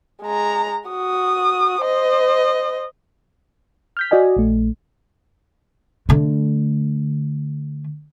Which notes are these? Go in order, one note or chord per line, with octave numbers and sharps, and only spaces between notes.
G#3 A#5
F#4 D#6
C5 D#5
F6 G6 B6
F#4 D5 D#5 G#5
A#1 A3
D3 A3